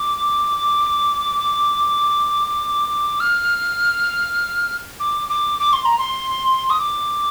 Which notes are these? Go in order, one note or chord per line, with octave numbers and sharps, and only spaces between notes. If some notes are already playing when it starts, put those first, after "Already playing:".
Already playing: D6
F6
D6
D6
D6
C6
A#5
C6
D#6
D6